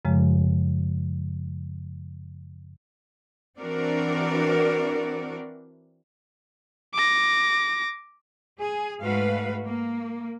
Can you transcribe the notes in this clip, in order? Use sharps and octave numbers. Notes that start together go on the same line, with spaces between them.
F#2 C#3 F3 G#3
E3 C4 D4 F#4 A#4 D5
D6 A#6
G#4
G#2 G#3 A3 F#4 B4 F5
A#3